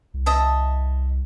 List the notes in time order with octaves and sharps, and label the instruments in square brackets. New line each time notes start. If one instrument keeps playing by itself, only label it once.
[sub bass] C2
[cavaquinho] D#5 E5 A5